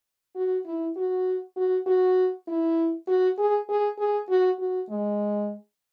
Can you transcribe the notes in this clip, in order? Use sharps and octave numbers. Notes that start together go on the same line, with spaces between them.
F#4
E4
F#4
F#4
F#4
E4
F#4
G#4
G#4
G#4
F#4
F#4
G#3